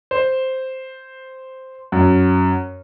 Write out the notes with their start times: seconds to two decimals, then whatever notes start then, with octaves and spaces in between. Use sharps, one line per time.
0.11 C5
1.92 F#2